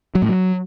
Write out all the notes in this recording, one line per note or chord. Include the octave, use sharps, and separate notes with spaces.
F#3
A2
F#3